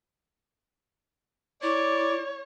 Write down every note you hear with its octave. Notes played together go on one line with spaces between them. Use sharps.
E4 C#5 D5 D6